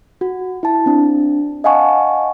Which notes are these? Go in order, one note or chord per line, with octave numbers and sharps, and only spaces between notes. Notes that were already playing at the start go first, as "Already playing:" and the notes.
F#4
E4 A5
C4 D4
D#5 F5 F#5 G#5 A5 C#6